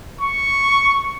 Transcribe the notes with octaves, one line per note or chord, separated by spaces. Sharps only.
C#6